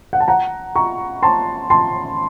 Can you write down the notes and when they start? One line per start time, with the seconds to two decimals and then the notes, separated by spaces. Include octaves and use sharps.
0.13 F#5
0.20 A5
0.28 F#5 A#5
0.75 A#5 C#6
1.23 A5 C6
1.70 A5 C6